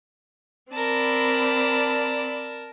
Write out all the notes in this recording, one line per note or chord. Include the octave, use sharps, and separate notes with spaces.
C4 A#4 D5 A5 B5